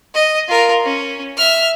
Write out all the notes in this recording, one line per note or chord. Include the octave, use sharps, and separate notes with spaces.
D#5
F4 A#4
C#4
E5 F6